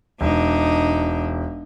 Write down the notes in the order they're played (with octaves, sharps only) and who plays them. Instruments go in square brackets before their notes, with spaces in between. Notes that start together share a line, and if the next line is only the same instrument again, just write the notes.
[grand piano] E1 [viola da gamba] D4 D#4